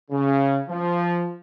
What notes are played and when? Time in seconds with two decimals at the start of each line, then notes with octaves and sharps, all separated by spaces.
0.11 C#3
0.69 F3